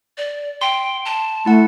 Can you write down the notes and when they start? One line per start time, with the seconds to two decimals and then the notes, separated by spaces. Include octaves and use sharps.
0.18 D5
0.61 G5 C6
1.06 A5
1.46 A3 E4 F#5